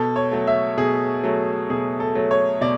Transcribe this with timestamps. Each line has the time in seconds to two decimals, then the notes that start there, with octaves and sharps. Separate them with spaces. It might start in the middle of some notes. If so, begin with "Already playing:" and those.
Already playing: B2 A4
0.16 C#5
0.31 F#3 A3
0.47 E5
0.77 B2 G#4
1.24 F#3 A3
1.70 B2 G#4
2.00 A4
2.15 F#3 A3
2.31 C#5
2.61 B2 D5